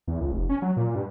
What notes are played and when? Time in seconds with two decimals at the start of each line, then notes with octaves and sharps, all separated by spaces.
0.08 E2
0.21 C#2
0.32 F1
0.49 C#4
0.62 F#3
0.77 A#2
0.95 G2